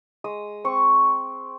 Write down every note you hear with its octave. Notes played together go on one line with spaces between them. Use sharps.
G#3 D#6
C4 C#6